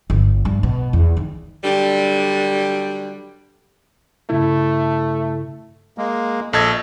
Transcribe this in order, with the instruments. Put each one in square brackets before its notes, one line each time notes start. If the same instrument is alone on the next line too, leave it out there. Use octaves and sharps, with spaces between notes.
[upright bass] G1
G2
B2
E2
D#3
[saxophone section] D3 F#3 G3
[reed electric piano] G2 C#3 E4 [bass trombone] A3
[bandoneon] G#3 A#3
[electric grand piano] A#1 A5 G#6 [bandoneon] A4 D#5